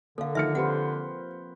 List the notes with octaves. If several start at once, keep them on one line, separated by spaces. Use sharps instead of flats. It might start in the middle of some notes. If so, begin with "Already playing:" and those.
D3 A#3 A4 F5
D#3 F3 E5 F6 C#7
C4 G4 B4 C5 F#5